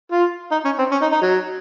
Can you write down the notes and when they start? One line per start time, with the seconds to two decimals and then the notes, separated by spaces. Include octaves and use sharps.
0.12 F4
0.51 D#4
0.65 C#4
0.79 C4
0.91 C#4
1.02 D#4
1.12 D#4
1.22 F#3